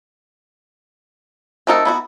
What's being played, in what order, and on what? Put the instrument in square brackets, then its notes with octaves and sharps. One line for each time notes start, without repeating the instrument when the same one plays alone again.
[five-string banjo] A3 F#4 A#4 [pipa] C4 D#4 A4
[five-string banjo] B3 E4 F#4